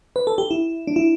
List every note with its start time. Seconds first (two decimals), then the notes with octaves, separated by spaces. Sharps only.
0.16 B4
0.27 A4
0.38 G4
0.51 E4
0.87 D4
0.96 E4